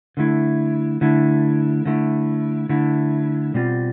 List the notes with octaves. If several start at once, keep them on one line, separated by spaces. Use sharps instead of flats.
D3 A3 E4
D3 A3 E4
D3 A3 E4
D3 A3 E4
B2 G3 C4 F4